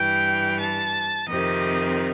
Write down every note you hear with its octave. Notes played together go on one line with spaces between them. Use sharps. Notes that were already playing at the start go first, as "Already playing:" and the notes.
Already playing: G2 E3 G5
A5
F2 C3 D#3 D#5